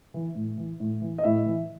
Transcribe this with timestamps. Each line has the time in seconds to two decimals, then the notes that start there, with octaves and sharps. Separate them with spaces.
0.14 E3
0.35 A2
0.58 E3
0.80 A2
1.02 E3
1.18 D#5
1.23 A2 E4 E5
1.46 E3